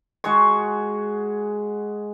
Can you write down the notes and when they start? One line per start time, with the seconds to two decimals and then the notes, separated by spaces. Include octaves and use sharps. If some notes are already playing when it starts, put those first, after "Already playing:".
0.24 G#3 F#4 G#4 C#6